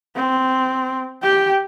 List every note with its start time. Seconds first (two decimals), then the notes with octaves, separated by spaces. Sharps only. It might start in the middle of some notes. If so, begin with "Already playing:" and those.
0.15 C4
1.23 G4 G5